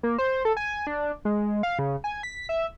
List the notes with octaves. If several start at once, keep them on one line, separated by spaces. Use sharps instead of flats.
A#3
C5
A4
G#5
D4
G#3
F5
C#3
G#5
B6
E5